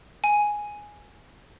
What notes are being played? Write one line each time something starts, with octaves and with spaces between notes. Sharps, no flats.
G#5